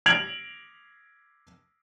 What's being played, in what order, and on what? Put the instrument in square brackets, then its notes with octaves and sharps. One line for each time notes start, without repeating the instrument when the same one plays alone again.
[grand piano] G#6 D7 F7 F#7